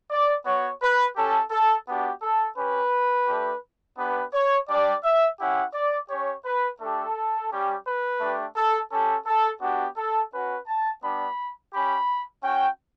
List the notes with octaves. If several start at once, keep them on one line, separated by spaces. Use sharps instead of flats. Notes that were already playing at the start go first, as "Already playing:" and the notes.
D5
B3 F#4 C#5
B4
C#4 G4 A4
A4
B3 D4 F#4 G4
A4
C#4 G4 B4
A3 D4 G4
B3 D4 G4 B4
C#5
G3 D4 G4 D5
E5
C#4 E4 G4 F#5
D5
C#4 G4 C#5
B4
A3 D4 G4 A4
G3 C#4 G4
B4
A3 D4 G4
A4
C#4 G4 A4
A4
B3 D4 F#4 G4
A4
C#4 F#4 B4
A5
G3 B3 D4 B5
C#4 G4 B5
C#4 F#4 G5